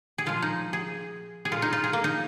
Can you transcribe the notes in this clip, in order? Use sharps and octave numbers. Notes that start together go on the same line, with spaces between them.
G#4
A#2 F3 G#3 F4
D#4
G#4
G#4
A#2 G#3 F4
D#4
F4
G#4
A#3
D#4